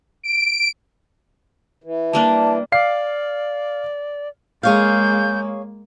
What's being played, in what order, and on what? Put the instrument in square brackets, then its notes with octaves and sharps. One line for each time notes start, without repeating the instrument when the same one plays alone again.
[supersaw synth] D7
[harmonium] E3
[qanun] G3 A#3 D4 [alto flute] A5
[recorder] D5 [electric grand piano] F5 C7
[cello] G#3 A#3 [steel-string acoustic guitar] G#4 C#5 F5 [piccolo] G6